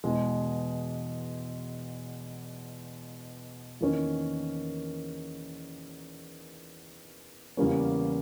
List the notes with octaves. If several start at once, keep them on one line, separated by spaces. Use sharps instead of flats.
E2 B2 G#3
E2 D#3 A#3 C#4
E2 C#3 G3 A#3 C#4